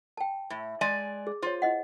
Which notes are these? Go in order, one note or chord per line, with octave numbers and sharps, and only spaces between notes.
G5 A5
A2
G#3 D5 G#5
G#4
F4 C5 C#5
E4 D#5 F#5